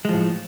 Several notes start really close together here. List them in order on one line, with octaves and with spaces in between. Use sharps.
G#3 F3 A2